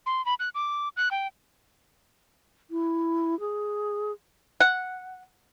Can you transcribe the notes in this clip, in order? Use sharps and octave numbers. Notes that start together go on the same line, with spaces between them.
C6
B5
F#6
D6
F#6
G5
E4
G#4
F#5